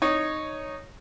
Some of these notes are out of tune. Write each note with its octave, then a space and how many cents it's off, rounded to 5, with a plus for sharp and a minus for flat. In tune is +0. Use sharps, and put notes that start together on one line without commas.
D#4 -10 C#5 +0